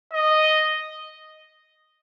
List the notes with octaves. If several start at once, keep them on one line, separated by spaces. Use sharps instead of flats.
D#5